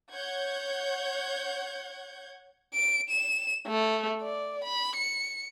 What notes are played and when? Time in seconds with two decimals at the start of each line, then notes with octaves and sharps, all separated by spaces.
0.11 C#5 F#5 G6 G#6
2.74 D7
3.10 E7
3.67 A3
4.22 D5
4.64 B5
4.96 C#7